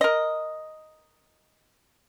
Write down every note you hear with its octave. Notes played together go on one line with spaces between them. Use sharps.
A#4 D#5